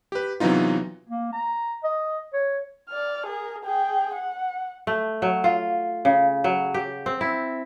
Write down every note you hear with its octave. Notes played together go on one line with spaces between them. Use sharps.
G4 B4
C3 E3 F#3 B3 D#4 F4
A#3
A#5
D#5
C#5
D5 F6
G#4 A#4
G#4 G5
F#5
A3
F#3
F4
C#3
F#3
G4
C4
E4